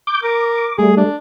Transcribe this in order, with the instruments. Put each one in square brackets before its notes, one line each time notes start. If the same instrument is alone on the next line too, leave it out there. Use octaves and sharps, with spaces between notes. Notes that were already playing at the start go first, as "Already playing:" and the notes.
[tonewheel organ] D6 G6
[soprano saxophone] A#4 [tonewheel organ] D6
[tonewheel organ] G3 A3 [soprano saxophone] G#4
[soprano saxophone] D4